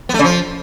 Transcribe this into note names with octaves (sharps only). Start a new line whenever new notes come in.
B3
A3
C#3
F3